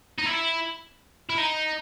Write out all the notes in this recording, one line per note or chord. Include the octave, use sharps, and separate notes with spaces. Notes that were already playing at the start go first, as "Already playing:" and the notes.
D#4
E4
E4
D#4